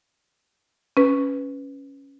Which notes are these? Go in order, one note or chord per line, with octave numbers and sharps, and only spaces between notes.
C#4 B4